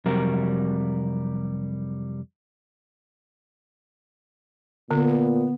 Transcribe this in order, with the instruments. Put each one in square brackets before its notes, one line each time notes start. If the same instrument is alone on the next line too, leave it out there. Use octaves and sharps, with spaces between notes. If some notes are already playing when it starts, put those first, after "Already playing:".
[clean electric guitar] F2 C3 F#3 G3 A#4
[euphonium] A#2 [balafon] D3 [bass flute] B3